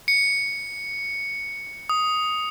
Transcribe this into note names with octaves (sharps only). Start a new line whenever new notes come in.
C#7
D#6